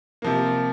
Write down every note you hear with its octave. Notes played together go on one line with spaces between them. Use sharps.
C3 F3 A#3